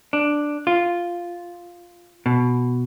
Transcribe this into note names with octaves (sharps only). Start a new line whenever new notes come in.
D4
F4
B2